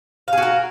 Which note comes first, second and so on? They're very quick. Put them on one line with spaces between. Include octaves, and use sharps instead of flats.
F5 G#4 F#4 A#4